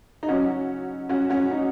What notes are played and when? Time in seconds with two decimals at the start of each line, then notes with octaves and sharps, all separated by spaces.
0.23 D#4
0.28 C#3 F#3 C#4 F#4
1.09 C#4 F#4
1.30 C#4 F#4
1.51 D#4